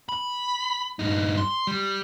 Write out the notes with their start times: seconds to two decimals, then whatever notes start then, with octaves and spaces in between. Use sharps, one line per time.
0.09 B5
0.99 G2 D#4
1.37 C6
1.67 G3